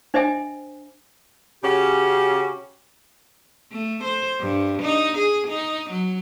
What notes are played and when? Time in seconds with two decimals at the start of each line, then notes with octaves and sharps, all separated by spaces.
0.14 D4 C5 D#5 E5 G5 G#5
1.63 C#3 C#4 F#4 G4
3.71 A3
4.04 C5
4.40 G2
4.82 D#4
5.17 G#4
5.47 D#4
5.90 F#3